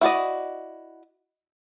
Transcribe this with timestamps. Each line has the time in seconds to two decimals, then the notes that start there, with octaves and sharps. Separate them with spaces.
0.01 E4 F#4 D5 D#5